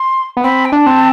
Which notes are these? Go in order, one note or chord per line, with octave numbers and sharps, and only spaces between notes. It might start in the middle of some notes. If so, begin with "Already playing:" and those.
Already playing: C6
B3
C4 B5
G5
D4 A5
C4